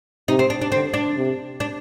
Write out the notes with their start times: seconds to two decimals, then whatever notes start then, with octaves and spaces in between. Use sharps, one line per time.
0.28 C3 D#4
0.39 C4
0.50 D4
0.61 D4
0.72 D3 C4
0.94 D4
1.17 C3
1.60 D4